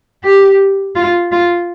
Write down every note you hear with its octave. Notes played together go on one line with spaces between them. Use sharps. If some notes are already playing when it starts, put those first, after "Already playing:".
G4
F4
F4